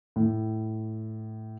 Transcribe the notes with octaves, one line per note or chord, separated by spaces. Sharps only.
A2